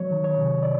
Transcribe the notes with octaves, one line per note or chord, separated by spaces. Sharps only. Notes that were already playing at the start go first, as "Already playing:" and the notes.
Already playing: F#3 C#5
D#3
C#5
C3
D5